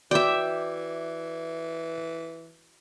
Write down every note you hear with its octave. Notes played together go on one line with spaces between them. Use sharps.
E3 F#4 D5 E5 G5 D6